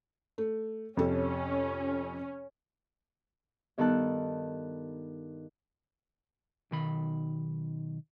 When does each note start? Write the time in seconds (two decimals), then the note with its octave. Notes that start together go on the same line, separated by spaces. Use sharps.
0.38 A3
0.97 F2 C3 C#4 A4
3.78 G2 D#3 B3 A4 A5 F#6
6.71 B1 D#3 B5